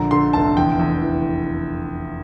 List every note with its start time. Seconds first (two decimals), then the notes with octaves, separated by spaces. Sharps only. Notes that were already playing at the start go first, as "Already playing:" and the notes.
Already playing: A#1 D3 A#5
0.11 D3 C6
0.33 F1 A5
0.57 E2 G5
0.79 E2
1.02 E3